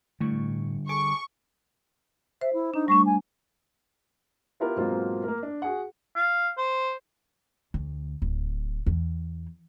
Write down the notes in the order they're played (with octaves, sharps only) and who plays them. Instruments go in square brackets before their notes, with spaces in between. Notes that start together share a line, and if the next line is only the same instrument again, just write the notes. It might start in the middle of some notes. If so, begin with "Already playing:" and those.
[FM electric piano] A2 C#6 [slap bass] D3 G3
[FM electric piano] G#4 A4 D6 [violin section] C#6
[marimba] C5 [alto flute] E5
[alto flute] E4
[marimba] D4 [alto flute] D#4
[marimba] G3 A3 D4 [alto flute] C#6
[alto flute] G#5
[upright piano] B3 E4 F4 G4 A#4 B4
G#2 B2 F#3 A#3 C4 F4
A#3 A#4
D4
F#4 G#4 F#5
[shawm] F5
C5
[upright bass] D2
D1
E2